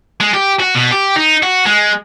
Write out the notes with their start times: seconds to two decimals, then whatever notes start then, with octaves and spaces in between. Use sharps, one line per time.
0.20 G#3
0.34 G4
0.60 F#4
0.75 B2
0.92 G4
1.16 D#4
1.43 F#4
1.66 G#3